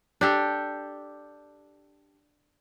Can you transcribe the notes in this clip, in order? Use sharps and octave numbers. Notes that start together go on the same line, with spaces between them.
D4 G4 A4